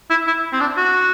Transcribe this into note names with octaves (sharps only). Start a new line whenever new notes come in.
E4
E4
C4
D4
F#4